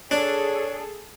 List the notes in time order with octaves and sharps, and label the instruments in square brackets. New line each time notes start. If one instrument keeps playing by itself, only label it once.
[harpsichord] D4 [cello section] G#4 A4 [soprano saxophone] C#5